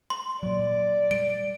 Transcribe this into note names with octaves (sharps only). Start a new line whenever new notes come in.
C6
A#2 F#3 D5
G3 D7